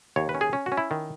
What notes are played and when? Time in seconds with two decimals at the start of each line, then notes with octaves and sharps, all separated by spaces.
0.16 D#2 C#5
0.29 B4
0.34 C#4
0.41 G#4
0.53 C#4
0.66 F#4
0.72 C#4
0.77 E4
0.91 D#3